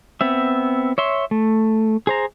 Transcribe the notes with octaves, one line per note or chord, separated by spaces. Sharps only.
B3 C4 E5
C#5 E5 C6
A3
G#4 C5 A#5